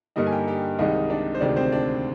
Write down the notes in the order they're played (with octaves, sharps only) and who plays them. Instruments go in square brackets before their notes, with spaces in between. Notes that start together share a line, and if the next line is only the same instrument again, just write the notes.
[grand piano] G2 D3 G3 A#3 D#4 D#5
G#5
G4 G5
G4 G5
C2 C3 D#3 G#3 D#4 D#5
D4 D5
C5
D2 C3 D#3 G#3 D4 D5
C4 C5
D4 D5